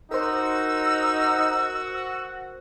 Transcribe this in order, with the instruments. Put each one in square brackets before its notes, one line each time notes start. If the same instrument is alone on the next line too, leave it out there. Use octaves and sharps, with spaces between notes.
[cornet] D#4 [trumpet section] F#4 [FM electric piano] A#4 C5 [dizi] E6